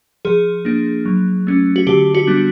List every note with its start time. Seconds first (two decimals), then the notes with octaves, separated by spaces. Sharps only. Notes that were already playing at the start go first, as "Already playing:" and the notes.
0.25 F3 G#4
0.65 A#3 D4
1.05 F#3
1.47 A3 C#4
1.76 F#4
1.87 D3 G4
2.15 F#4
2.27 G3 B3 D4